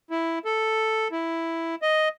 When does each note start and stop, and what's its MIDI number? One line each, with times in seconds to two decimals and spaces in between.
0.10 0.39 64
0.45 1.08 69
1.12 1.75 64
1.82 2.09 75